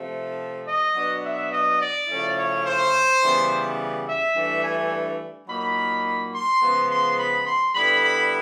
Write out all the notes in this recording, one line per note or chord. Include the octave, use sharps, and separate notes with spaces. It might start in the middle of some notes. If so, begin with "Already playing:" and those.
Already playing: C3 F3 A3
D#5
B2 F#3 B3 D4
E5
D#5
D5
C#3 F3 A3 C#4 E4
C#5
C5
C#3 E3 G3 B3
E5
G2 E3 A3 D4
G#5
A#2 F#3 A#3 D#4 B5
C6
C#3 F3 G#3 B3
C6
B5
C6
D3 G3 B3 E4 B5
B5